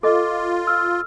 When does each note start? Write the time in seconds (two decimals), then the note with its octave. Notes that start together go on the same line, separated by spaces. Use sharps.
0.03 F4 A4 D#5 D6
0.67 E6 F6